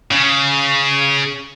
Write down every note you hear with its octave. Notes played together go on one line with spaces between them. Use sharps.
C#3